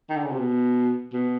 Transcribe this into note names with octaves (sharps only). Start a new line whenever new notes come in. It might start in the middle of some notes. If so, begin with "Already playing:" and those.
D#3
D3
C#3
C3
B2
B2